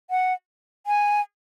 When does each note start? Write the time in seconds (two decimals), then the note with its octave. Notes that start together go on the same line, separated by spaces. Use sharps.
0.10 F#5
0.87 G#5